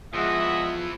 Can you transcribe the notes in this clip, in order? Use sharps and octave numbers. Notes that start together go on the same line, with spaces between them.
E2 E3 F3 G#3 D#5 E5 F#5